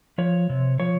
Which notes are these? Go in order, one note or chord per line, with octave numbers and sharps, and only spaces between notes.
F3 C#5
C3
F3 C#5